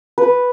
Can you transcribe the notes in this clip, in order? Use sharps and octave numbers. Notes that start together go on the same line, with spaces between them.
B4